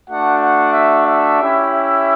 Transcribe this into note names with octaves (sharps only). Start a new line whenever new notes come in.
A3 D4 F#4 F#5
F#5
E5
E5
C#4 E4 G4
E5